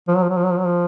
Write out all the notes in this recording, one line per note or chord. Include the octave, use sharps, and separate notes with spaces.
F3
F#3
F3
F#3
F3
F#3
F3
F#3
F3